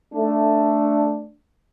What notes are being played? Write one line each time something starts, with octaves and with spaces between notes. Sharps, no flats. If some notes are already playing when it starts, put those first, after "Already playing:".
A3 D4